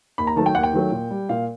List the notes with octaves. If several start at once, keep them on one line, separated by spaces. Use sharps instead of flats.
D#2 B5
A#5
D#3 F#3 A3 A5
G5
D#2 F#5
G5
D#3 F#3 A3
A#2
G3
A#2 F5